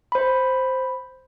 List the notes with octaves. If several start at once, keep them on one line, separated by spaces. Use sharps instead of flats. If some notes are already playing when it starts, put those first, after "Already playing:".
C5 B5